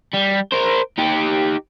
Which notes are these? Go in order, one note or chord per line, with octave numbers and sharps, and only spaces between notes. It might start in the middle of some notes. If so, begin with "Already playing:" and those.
G3
A#4 C5
D#4 G4